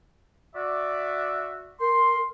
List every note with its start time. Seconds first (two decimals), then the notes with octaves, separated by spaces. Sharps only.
0.55 F#4 D5 E5
1.80 A#4 C6